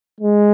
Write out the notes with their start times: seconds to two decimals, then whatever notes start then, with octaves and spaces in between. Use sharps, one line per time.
0.21 G#3